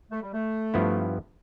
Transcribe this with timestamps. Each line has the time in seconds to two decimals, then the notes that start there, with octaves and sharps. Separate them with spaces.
0.11 A3
0.22 G3
0.33 A3
0.74 G2 F3 B3 E4